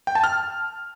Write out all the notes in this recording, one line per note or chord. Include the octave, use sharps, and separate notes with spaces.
G5
A5
F6